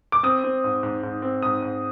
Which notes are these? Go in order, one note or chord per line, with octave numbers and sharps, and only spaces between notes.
D6
C4 D#6
C4
G#2
G#2
G#2
C4
G#2 D#6
G#2